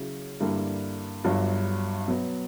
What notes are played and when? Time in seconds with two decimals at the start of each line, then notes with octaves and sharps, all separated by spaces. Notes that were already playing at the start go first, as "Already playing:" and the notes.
Already playing: C#3 F#3 C#4 E4
0.40 G2 D3 G3 A#3 E4
1.24 G1 G2 F#3
2.08 B2 F#3 B3